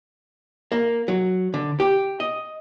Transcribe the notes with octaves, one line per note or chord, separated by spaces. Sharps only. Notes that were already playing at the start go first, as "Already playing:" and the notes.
A#3
F#3
D3
G4
D#5